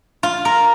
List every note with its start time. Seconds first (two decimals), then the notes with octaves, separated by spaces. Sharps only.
0.23 F4
0.45 A#4